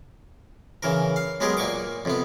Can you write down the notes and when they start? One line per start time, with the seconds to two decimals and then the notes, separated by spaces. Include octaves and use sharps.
0.83 C#3 E3 A#4
1.16 F5
1.40 F#3 G#3 B3 G4 G#4 A#4
1.57 A#2 A#3 C#6 D6
2.05 F2 C3 B3